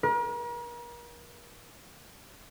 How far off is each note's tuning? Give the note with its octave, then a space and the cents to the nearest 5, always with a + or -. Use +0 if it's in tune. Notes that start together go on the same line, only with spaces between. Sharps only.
A#4 +40